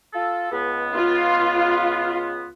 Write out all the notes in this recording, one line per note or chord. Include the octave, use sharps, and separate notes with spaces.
F4 A4
C#2 B3
F4